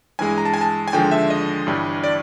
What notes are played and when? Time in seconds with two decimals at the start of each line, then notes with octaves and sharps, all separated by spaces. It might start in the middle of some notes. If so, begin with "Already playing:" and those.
0.19 G2 E3 G#3 G#5
0.38 A#5
0.45 A5
0.54 G#5
0.61 A5
0.88 G#5
0.93 D#2 D3 F3 G#3 G5
1.11 E5
1.30 D#5
1.66 G1 G2 E3 G3
2.04 D5